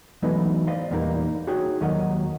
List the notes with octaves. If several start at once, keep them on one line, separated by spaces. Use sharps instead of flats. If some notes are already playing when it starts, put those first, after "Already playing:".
E3 F#3 G#3 A3 B3 D#4
C5 D5 D#5 F5
E2 A#2 G3 A#3 D#4 A#4
D#4 F#4 G#4 C#5 G5
D#2 D#3 F#3 A#4 D#5 F#5